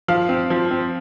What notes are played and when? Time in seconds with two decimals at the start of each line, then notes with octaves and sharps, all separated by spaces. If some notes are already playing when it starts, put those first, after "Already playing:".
0.08 F3 F5
0.29 C4
0.50 F3
0.71 C4